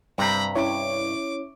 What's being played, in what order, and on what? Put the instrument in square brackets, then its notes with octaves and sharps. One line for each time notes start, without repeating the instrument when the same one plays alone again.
[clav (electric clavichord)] G2 C3 C4 [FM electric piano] G3 [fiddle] A#5 B5
[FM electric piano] C#4 E4 C#5 [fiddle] D6